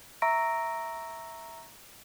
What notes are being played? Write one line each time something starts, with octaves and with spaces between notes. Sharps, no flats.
E5 A#5 C#6 E6 A#6 D7